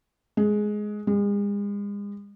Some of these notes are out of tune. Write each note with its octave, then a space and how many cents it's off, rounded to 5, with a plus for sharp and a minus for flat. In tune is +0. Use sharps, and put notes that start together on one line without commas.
G#3 +10
G#3 -40